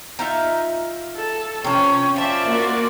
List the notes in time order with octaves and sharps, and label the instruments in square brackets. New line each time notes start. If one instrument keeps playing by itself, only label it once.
[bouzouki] D#4 F4 E5
[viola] A4
[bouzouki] C3 F3 [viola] C#4
[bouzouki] F3 A5 [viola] F4 D5 [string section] E5
[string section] A#3 F#4